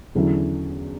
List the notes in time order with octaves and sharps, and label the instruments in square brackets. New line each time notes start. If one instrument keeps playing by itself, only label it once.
[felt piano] E2 D3 F#3 C#4 E4